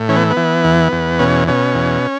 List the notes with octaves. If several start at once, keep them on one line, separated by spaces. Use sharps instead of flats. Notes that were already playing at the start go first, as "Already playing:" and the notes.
Already playing: A2
E3 C#4
B3
B3
E3
E2
E2
B2 C#4
B2 C#4
E2